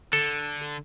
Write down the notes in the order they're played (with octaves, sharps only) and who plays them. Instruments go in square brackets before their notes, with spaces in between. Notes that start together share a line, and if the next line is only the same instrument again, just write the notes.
[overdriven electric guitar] D3 [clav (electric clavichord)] A4